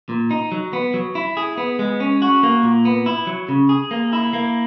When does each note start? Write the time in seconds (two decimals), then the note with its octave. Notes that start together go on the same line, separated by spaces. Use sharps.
0.09 A#2
0.31 D#4
0.52 F#3
0.73 B3
0.94 F#3
1.15 E4
1.37 G#4
1.57 B3
1.79 G#3
2.00 C#4
2.22 F#4
2.43 A#3
2.63 A#2
2.85 B3
3.06 E4
3.27 F#3
3.49 C#3
3.69 G#4
3.91 A#3
4.13 E4
4.33 A#3